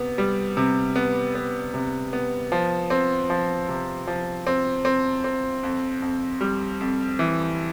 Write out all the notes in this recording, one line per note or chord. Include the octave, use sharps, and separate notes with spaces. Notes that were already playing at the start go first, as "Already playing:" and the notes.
Already playing: C3 B3
G3
C3
B3
B3
C3
B3
F3
C4
F3
C3
F3
C4
C4
C4
F2
F2
G3
F2
E3